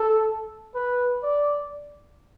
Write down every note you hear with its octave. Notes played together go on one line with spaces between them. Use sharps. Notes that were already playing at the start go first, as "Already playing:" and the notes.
Already playing: A4
B4
D5